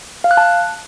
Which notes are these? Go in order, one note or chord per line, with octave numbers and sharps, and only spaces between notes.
F5
F#6
A5